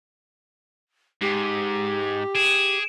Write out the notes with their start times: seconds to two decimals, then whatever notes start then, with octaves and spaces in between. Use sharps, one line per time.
1.22 G#2 G4
2.35 G#4 D7 E7